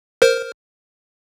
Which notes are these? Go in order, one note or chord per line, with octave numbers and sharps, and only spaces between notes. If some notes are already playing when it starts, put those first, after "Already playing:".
A#4 C5 F6